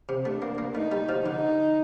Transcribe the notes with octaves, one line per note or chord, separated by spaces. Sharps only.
C3
A3 D4
A#3
A#3
A3 D#4
G3
F3
D3 D#4